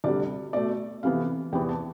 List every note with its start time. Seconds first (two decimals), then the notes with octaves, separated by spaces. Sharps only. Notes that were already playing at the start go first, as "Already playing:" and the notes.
0.04 D2 C3 G3 D5
0.53 B2 A3 D5
1.03 F2 C3 E3 B3 F5
1.52 E2 C3 E3 B3 G5
1.69 A5